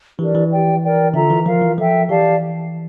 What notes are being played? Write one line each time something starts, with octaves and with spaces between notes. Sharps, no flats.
E3 D4 G4 A#4 D5
E3
G4 D5 G5
A#4 D5 G5
D3 F4 A4 E5 A#5
E3
F3 F4 A#4 F5
E3
F3 A4 E5 G5
E3 G4 D5 F5 A5